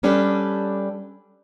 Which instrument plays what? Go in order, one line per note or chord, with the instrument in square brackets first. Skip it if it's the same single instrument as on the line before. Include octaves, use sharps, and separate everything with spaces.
[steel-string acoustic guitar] G3 C#4 D4 G4 A4 B4